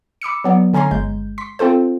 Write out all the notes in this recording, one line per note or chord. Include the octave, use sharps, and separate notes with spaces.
B5 D6 E6 C#7
F#3 B3 D5
D3 C#4 G#5 A#5 C6
G1 G#3 G6
C6 B6
C4 F4 A4 C5